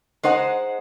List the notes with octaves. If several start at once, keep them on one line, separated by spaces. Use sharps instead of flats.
G#3 D#4 C5 F#5